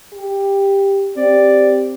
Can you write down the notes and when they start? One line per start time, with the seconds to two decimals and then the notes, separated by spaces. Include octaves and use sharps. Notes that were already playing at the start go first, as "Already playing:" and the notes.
0.13 G4
1.17 C4 G4 D5